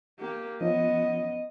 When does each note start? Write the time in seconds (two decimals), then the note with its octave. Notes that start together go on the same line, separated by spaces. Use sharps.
0.20 A#3 G4
0.61 F3 B3 C#4 D#5